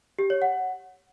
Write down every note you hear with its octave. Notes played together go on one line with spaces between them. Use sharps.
G4
C#5
F#5